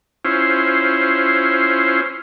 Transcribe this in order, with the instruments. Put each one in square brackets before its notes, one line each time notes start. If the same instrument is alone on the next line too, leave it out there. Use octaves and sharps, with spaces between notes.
[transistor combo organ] C#4 E4 F4 C5